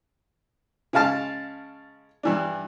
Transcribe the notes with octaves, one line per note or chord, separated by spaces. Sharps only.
C#3 G#3 F5 A5 F6
G2 E3 D4